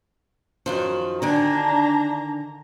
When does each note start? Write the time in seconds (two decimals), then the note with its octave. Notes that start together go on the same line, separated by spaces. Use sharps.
0.66 F#2 D#3 F3
1.22 D3 D#3 D4 G#5 A#5